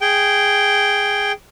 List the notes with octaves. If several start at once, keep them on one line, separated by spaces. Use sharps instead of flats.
G#4 G5